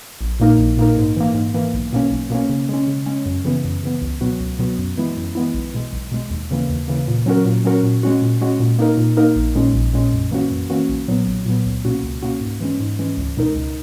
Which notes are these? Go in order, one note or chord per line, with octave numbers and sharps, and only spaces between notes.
A#1
A#2 A#3 D#4 A#4
A#1
A#2 A#3 D#4 A#4
G#2
E3 A#3
G#2
E3 A#3
B1
B2 A#3 C#4
B1
B2 A#3 C#4
C#3
G#3 C#4
C#3
G#3 C#4
F#2
C#3 E3 B3
F#2
C#3 E3 B3
C#2
B2 F#3 B3 F#4
C#2
B2 F#3 B3 F#4
F#2
E3 G#3 B3 E4
F#2
E3 G#3 B3 E4
B1
B2 G#3
B1
B2 G#3
D#2
C#3 E3 A#3
D#2
C#3 E3 A#3
A#2
F#3 C#4 F#4 A#4
A#2
F#3 C#4 F#4 A#4
A#2
G#3 C#4 F#4
A#2
G#3 C#4 F#4
A#2
A#3 D#4 A#4
A#2
A#3 D#4 A#4
A#1
A#2 G#3 C#4
A#1
A#2 G#3 C#4
F#2
E3 A#3 C#4 F#4
F#2
E3 A#3 C#4 F#4
B1
A#2 F#3 B3
B1
A#2 F#3 B3
C#2
B2 A#3 C#4 F#4
C#2
B2 A#3 C#4 F#4
G#2
E3 G#3 C#4
G#2
E3 G#3 C#4
C#2
B2 G#3 D#4 A#4
C#2